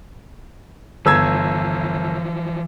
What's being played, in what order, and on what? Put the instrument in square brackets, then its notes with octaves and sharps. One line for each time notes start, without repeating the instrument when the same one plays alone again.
[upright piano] G1 E6 G#6 [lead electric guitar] E3 F3